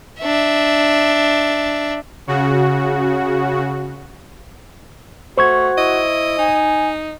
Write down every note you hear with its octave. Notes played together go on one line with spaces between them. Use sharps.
D4 E5
C#3 F#4
A3 F#4 C5 C#6 G#6
E4 D#5
D#4 G#5